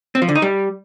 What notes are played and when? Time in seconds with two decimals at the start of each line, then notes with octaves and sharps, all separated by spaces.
0.15 C4
0.22 F3
0.29 D3
0.35 D#4
0.42 G3